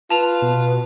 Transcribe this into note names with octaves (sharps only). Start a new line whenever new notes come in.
F4 B4 A5 F7
B2